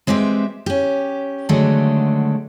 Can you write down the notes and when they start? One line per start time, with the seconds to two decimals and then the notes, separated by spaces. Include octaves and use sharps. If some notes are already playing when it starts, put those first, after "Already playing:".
0.07 G#3 C4 G4 B4 E5
0.66 C#4 G4
1.49 D3 D#3 F#3 G#3 A3 D4